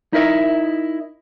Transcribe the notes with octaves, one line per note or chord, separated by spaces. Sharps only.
D#4 E4 A#4 D#5 E5